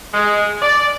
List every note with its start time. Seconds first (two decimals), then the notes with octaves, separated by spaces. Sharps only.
0.14 G#3
0.62 D5